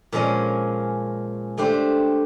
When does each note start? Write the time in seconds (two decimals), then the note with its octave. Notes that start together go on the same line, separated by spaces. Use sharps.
0.12 A#2 F3 G#3 C#4
1.58 A3 D4 G4 C5